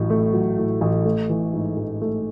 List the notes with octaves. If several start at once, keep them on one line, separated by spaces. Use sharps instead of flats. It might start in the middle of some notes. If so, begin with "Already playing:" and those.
Already playing: A1 A2 F#3
A3
F#3
A2
A1
A3
E3
G#2
A1
A3